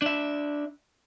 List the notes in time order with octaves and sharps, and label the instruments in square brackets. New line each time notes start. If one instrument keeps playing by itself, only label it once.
[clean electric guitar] D4 E5